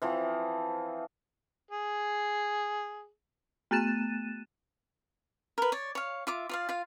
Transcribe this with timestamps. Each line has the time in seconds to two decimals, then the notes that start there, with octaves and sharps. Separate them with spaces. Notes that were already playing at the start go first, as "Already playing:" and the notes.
0.02 E3 F3 C4
1.71 G#4
3.71 A3 B3 F#6 A6 D#7 E7
5.58 A#4 B4
5.72 C#5 D5
5.95 C#5 F5
6.27 F4 E5 D6
6.49 F4 D5 F5
6.69 F4 F5